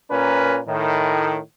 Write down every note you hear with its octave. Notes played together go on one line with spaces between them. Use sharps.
A#2 C#4 A#4 B4
A2 D#3